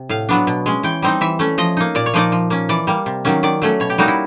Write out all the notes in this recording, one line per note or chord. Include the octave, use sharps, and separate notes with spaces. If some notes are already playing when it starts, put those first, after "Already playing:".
Already playing: C3
A2 F5
F#3 B3 D4
B2
G#3 C#4
E3 G5
G3 C4 D#4
E3 E5
A3 C#4
F3 D#5
A#3 D#4
A#2 D5
C#5
F3 A#3 D#4 D5
F3
A#3 C#4
E3 D5
G3 A#3
C3
D#3 F#3 A#3 C#4
D#3 D5
F#3 A3 C#4
B2 C#5
G4
G3 A#3 D#4 F#4
E4